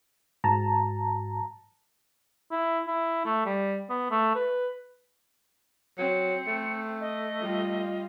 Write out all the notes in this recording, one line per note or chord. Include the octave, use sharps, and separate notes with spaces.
G#2 F#4 A5 A#5
E4
E4
A3
G3
B3
A3
B4
F#3 C4 C#7
A3
D#5
G3 F4